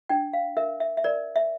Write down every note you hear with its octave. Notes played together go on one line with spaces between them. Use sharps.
D4 G5
F5
A#4 E5
E5
E5
A#4 D5
E5